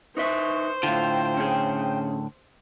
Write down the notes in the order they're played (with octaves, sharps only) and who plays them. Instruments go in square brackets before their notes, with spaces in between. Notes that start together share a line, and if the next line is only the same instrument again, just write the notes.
[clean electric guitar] D#4 B4 E5 [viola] C5 [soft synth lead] C#6
[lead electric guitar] A2 D3 [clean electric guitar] F4 [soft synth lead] G5
[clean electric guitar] C#4 G#4